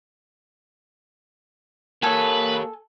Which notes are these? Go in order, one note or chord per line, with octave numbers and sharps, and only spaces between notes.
A#3 G4 A4 B4 C#5 G#5